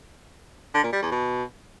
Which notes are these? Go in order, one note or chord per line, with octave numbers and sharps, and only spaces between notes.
D3
A#2
G3
E2
B2